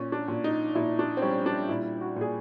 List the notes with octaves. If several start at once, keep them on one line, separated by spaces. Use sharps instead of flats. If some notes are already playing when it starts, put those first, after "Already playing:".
Already playing: A#2 C#4
D4
A#2
D#4
A#2 E4
D4
C4
G3 C#4
D4
A#2 E4
F#4
A#2 G#4